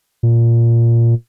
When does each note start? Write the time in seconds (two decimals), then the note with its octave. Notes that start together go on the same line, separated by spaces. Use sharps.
0.23 A#2